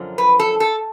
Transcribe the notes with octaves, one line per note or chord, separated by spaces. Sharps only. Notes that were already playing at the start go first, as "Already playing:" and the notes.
Already playing: F#2 D3 F3
B4
A4
A4